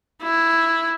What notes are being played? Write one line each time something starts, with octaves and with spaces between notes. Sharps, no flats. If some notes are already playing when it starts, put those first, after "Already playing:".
E4